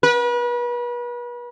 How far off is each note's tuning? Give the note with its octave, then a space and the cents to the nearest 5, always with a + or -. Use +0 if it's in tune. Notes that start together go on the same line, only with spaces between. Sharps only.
B4 -35